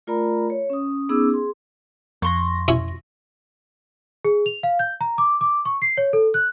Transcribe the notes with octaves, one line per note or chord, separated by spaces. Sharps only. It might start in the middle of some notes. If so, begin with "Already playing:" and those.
A3 F4 A#4 D5 A#5 B5
C#5
C#4 D#6
B3 C#4 D#4 G#4 D6 E6
G#4 C6
F2 C6 C#6 A#6
C#4 E4 C#5
G#4
F7
F5
G6
A#5
D6
D6
C#6
C7
C#5
A4
F#6